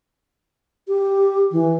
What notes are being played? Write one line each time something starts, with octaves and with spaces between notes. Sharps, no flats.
G4
E3